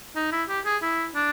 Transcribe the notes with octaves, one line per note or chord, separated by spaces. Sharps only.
D#4
E4
G4
G#4
E4
D4